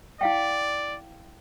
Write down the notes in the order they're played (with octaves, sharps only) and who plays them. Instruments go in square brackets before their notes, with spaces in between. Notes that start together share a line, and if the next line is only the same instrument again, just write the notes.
[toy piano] E4 F5 G5 [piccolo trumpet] D5